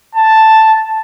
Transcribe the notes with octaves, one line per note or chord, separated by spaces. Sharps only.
A5